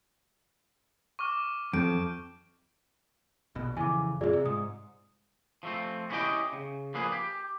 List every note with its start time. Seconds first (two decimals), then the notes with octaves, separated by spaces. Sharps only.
1.19 C#6 D6 F6
1.73 F2 G6 D7
3.55 A#1 B2
3.77 F2 C#3 E3 G#5 D6
4.21 F#2 A2 C3 F4 G#4 D5
4.33 C3
4.46 G#2 D#6
5.63 F3 A3 C4
6.10 B3 C#4 E4 G4 D#5 G5
6.52 C#3
6.94 D3 F3 A#3 G#4 B4
7.12 G4